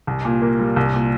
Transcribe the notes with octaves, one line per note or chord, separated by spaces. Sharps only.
C2
A#2
A#3
G3
C2
A#2